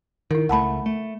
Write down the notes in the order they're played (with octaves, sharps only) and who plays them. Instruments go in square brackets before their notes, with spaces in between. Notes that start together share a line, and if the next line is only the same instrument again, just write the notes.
[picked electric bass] D#3 [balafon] E4 A#4
[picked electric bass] C#2 A3 [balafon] F#5 A5 B5
[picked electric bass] A3